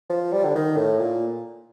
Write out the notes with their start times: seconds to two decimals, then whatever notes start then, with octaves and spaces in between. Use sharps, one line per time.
0.09 F3
0.32 G3
0.45 D3
0.55 D#3
0.76 A2
0.99 A#2